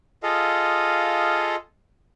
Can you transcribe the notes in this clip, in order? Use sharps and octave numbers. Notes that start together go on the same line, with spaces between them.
F4 G#4 A4 D#5 F5